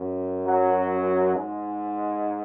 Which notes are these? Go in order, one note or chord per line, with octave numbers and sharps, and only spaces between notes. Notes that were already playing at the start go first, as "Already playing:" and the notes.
Already playing: F#2
F#3
G#2 G#3